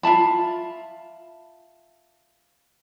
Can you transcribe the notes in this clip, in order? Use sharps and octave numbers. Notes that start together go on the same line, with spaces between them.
F4 E5 A5 B5